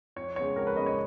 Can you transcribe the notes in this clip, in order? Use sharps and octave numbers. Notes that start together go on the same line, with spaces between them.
F2 C#5
C#3 G#3 B3 C#5
F2 A#4
B4
C#3 G#3 B3 D#5
C#5